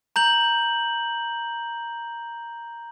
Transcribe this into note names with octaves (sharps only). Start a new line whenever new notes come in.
A#5 G6 F#7